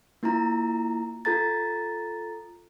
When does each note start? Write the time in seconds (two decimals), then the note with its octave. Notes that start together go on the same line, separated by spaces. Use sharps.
0.23 A#3 E4 F4 A#5
1.25 F4 A4 A#5 A6